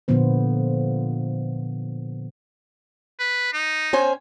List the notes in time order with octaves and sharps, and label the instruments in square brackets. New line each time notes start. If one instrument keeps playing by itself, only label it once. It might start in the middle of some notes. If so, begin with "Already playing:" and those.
[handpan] A#2 D3 F3 B3 C5
[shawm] B4
D#4
[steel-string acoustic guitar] C#4 C5 G#5